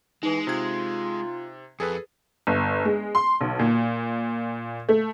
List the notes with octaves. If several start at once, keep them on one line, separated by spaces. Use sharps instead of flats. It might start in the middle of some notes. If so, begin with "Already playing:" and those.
E3 G#3 D#4
C3 F4 G#6
F2 G#4 A4 B4
G1
G#3
C6
B1
A#2
A3